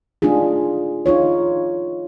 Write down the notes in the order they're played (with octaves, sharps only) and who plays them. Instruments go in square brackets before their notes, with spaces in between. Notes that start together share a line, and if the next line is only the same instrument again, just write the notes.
[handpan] A3 D4 D#4 F4 G#4
D#4 F4 C#5